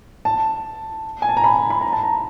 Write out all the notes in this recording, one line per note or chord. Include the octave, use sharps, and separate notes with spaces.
A5
G#5
A5
A#5
B5
A#5
B5
A#5
A5
A#5